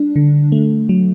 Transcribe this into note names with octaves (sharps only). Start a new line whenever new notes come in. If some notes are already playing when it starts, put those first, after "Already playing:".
Already playing: G3 D4
D3
A3
F#3